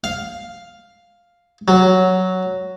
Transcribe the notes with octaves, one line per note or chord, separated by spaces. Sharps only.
F5
F#3